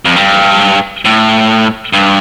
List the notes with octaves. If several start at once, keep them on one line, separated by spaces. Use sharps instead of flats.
F2
G2
A2
G2